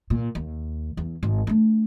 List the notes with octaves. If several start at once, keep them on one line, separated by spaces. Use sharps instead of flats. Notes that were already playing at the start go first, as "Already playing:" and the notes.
A#2
D#2
E2
G#1
A3 D4